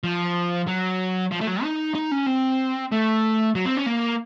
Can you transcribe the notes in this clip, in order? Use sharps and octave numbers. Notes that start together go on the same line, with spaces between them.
F3
F#3
F3
A3
F#3
D#4
D#4
C#4
C4
A3
F#3
C4
C#4
A#3